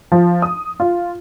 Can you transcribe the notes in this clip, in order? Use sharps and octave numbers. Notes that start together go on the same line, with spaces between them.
F3
D#6
F4